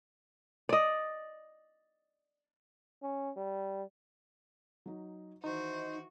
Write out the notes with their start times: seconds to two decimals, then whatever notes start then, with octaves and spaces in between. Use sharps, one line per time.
0.69 D5 D#5
3.02 C#4
3.36 G3
4.86 F#3 D#4
5.44 D#3 E3 D#4 F#4 C5